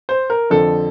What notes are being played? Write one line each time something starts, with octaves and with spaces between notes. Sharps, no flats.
C5
A#4
F2 D3 F3 A4